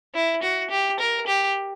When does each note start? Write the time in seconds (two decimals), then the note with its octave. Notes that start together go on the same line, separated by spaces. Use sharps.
0.15 E4
0.43 F#4
0.70 G4
1.00 A#4
1.27 G4